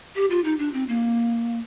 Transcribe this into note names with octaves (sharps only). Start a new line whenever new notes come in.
G4
F4
D#4
D4
C4
A#3